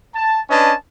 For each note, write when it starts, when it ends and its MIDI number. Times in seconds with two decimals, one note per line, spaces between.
0.14 0.40 81
0.50 0.74 61
0.50 0.74 62
0.50 0.74 71
0.50 0.74 75
0.50 0.74 80
0.50 0.74 81